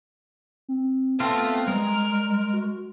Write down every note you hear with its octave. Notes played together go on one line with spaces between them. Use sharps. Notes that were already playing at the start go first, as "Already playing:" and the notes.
C4
B3 C4 F4 A4 E5 G5 A5
G3 G#3 A#4
F#4